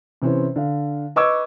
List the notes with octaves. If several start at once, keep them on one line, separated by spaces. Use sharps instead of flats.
C3 E3 C4 C#4
D3 F5
B4 D#5 C#6 D6 E6 G#6